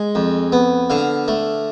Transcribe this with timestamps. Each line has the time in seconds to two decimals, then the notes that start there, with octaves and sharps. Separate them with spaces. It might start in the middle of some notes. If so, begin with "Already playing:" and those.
Already playing: G#3
0.15 F2
0.52 B3
0.90 D3 F5
1.28 A3